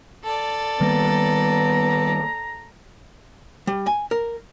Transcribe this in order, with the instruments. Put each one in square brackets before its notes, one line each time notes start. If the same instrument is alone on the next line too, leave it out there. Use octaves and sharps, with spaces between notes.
[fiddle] A4 D5
[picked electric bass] D#3 G3 A#3 [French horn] B3 [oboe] A#5
[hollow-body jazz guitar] G3
G#5
A#4